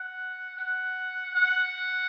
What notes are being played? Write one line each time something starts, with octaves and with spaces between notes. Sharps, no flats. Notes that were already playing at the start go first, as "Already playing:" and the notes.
Already playing: F#5
F#5
F#5